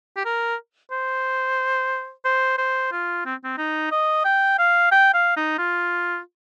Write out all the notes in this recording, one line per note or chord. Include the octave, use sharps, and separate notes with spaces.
G4
A#4
C5
C5
C5
F4
C4
C4
D#4
D#5
G5
F5
G5
F5
D#4
F4